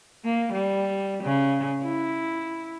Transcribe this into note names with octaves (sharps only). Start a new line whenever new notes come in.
A#3
G3
C#3
E4